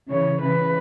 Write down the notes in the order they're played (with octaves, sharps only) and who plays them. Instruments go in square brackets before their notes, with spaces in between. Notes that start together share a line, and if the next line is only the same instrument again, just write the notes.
[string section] C#3 E3 [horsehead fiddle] C#5
[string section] C#3 E3 [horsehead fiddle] B4